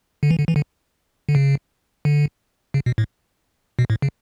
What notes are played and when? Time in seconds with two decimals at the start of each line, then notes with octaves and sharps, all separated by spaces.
0.23 D3
0.30 E3
0.39 D3
0.48 E3
0.56 D3
1.29 D3
1.35 C#3
2.05 D3
2.74 C#3
2.86 B2
2.98 A2
3.79 B2
3.90 A2
4.02 C#3